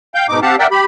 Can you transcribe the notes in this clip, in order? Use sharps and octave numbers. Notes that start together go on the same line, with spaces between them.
F5 G5 G6
G#2 B2 D#4 D6
C4 G4 F5 F#5 A5
A#4 D5 E5 F#5 G5
G4 B5